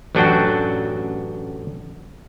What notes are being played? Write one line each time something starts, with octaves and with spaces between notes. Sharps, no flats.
A1 F#2 F#3 D4 F#4 G5